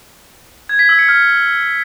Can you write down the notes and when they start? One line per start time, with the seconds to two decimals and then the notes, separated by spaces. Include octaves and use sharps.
0.69 G#6
0.79 B6
0.89 E6
0.99 C#7
1.08 F6